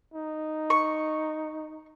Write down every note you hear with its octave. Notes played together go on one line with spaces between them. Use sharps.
D#4
C#6